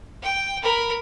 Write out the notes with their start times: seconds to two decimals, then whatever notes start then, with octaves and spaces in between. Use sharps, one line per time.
0.23 G5
0.62 A#4 B5